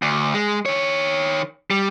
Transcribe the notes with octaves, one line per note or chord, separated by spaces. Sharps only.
D2
G#3
D#3 C#5
G3